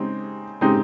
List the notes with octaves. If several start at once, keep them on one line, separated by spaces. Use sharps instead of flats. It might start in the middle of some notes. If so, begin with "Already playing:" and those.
Already playing: C#3 G#3 C4 D#4 G4
C#3 G#3 C4 D#4 G4